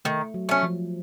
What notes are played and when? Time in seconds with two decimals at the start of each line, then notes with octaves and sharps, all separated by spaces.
0.05 D#3 A3
0.34 F#3
0.49 A3 C#4
0.63 F3